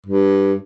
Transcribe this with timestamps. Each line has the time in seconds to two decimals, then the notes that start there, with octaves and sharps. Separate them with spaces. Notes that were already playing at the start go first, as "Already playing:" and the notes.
0.07 G2